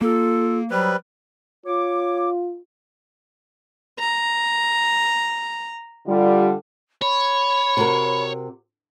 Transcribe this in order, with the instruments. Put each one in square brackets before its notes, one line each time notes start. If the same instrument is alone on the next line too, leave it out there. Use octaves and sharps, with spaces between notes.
[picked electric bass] A#3 [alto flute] F4 [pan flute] A4
[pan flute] F#3 [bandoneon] G3 B4 [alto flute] C5
[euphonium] F4 [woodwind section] C#5 D6
[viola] A#5
[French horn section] D3 G3 F4
[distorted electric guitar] C#5 [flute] B5
[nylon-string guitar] C3 F#4 A#4